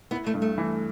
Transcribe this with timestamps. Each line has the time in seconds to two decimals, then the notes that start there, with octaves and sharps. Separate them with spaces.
0.11 B3 E4
0.26 A3
0.34 G2
0.42 A3
0.58 E3